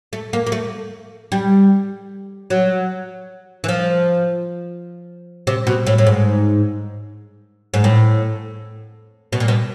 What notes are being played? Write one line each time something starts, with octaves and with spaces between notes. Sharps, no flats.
A3
A#3
A#3
A3
G3
F#3
E3
F3
C3
B2
A2
A2
G#2
G#2
A2
B2
A#2
B2